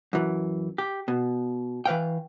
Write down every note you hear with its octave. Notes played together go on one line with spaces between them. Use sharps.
F#2 E3
G4
B2
E3 B4 F5 G5